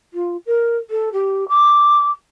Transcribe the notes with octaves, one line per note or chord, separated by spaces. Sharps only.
F4
A#4
A4
G4
D6